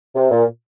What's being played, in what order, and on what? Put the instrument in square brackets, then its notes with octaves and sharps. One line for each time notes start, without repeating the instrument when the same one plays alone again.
[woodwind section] C3
A#2